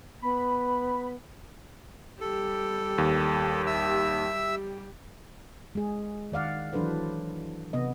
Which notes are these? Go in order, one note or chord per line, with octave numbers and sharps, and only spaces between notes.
B3 B5
G3 G4 A4
D#2
E5 E6
G#3 G#4
D#3 D5 F5 F#5
E3 F#3 D4 A4 B4 C5
C3 B3 D#5